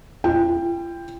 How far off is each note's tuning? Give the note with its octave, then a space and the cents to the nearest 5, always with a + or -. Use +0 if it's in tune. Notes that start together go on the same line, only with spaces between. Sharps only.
F4 -45 G5 +10